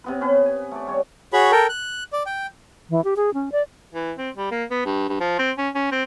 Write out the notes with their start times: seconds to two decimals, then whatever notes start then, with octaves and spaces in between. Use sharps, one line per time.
0.04 C3 B3 B4
0.21 C#4 B4
0.46 G#5
0.71 A3 D5
0.87 G3 C#5
1.33 F#4 G#4 C#5 B5
1.52 A4 A#4 G5
1.69 F#6
2.13 D5
2.26 G5
2.90 E3
3.04 G4
3.16 G#4
3.34 C#4
3.52 D5
3.94 E3
4.18 C4
4.36 G3
4.51 A#3
4.70 B3
4.85 G2
5.09 G2
5.20 F3
5.39 C4
5.58 C#4
5.75 C#4
5.91 C4